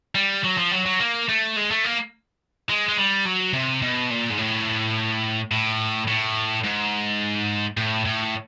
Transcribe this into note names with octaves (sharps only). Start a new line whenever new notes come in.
G3
F#3
F3
F#3
F#3
A#3
A3
G#3
A3
A#3
G#3
G#3
G3
F#3
C3
B2
A#2
G#2
A2
A2
A2
G#2
A2
A2